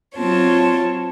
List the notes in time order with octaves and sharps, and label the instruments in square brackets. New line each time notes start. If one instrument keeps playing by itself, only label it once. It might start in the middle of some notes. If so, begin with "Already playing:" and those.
[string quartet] F#3 C4 F4 C#5 A5